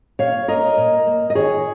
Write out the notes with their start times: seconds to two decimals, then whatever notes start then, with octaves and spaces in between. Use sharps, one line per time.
0.19 A#2 C#5 F5
0.48 A#3 A#4 D#5
0.77 A#2
1.07 A#3
1.30 D#5
1.35 D#3 G#4 C#5